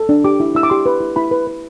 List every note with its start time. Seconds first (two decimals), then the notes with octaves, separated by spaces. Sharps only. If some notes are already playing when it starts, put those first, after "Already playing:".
Already playing: A4
0.09 D4
0.24 G4 D6
0.40 E4
0.55 E4 E6
0.63 D6
0.70 G4 C6
0.86 B4
1.00 E4
1.16 E4 B5
1.31 B4
1.47 B4